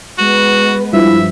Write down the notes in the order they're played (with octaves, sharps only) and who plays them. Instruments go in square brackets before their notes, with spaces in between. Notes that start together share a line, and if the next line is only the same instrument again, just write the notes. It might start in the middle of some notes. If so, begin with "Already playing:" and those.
[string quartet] G#3 B3 B4 [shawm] F#4
[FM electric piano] G2 F3 [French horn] E4 [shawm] E5